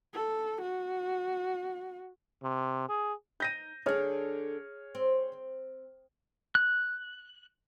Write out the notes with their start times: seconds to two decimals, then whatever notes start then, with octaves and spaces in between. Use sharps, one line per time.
0.14 A4
0.62 F#4
2.43 C3
2.89 G#4
3.40 D#4 G6 A#6 D#7
3.86 D3 D4 G#4 C#5 F6
4.95 C4
6.55 F#6